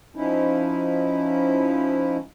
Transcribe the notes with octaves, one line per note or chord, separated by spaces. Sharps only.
F3 C#4 D#4 E4